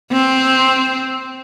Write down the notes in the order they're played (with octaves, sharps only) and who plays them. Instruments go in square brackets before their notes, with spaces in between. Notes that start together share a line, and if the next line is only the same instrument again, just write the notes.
[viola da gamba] C4